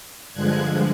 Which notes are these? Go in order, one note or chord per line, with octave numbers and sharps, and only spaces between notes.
G2 D3 F3 G#3 F#6 G#6